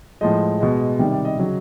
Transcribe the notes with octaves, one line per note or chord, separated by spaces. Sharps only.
A2 F3 G#3 D#5
B2 G#3
C3 D#3 G3
D5
D#5
C#3 F#3 D#5